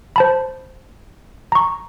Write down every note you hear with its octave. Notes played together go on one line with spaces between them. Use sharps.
C5 A5 B5
A#5 C#6